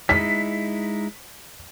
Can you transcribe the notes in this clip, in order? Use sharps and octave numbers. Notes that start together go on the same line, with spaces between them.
G#3 D#4 E4 B6